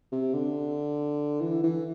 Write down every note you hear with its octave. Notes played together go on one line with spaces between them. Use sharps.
C3
D3
E3
E3